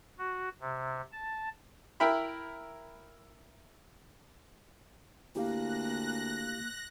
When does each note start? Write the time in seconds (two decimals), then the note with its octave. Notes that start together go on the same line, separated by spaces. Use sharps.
0.19 F#4
0.61 C3
1.13 A5
2.00 E4 A#4 E5 G5 B5
5.35 D2 A#3 E4 G4 F5 F#6 A#6